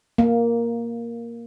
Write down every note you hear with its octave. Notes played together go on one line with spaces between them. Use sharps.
A#3